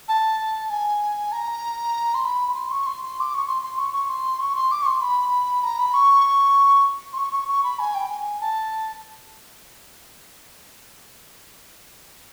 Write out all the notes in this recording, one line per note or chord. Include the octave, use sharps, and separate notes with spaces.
A5
G#5
A#5
C6
B5
B5
C6
C#6
C6
D6
C#6
C6
C6
C#6
C#6
C6
C#6
C6
D6
C#6
C6
B5
A#5
B5
C#6
C6
C#6
C#6
C#6
B5
G#5
G5
G#5
A5